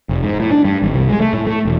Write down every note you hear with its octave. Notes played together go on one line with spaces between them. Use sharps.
F1
G#2
A2
D4
G2
G#1
C2
G#3
A3
A2
A3
E1